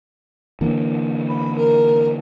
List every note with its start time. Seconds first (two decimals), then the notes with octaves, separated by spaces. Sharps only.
0.61 D3 E3 A#3
1.28 B5
1.56 A#4